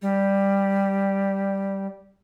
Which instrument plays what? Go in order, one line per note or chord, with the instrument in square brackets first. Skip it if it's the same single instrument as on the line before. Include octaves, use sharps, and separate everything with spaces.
[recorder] G3